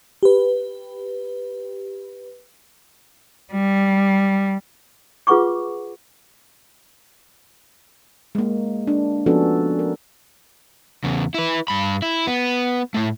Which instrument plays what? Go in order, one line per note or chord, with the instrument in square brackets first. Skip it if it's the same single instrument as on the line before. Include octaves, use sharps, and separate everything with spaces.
[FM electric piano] G4 B4
[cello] G3
[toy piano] F4 G#4 B4 F#5 C#6 D6
[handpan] G#3 A#3
D4
F3 B3 C#4 D4 F#4 A4
A#4
[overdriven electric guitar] E2 C#3
E4 B4
G2 B5
E4
B3
A2 A3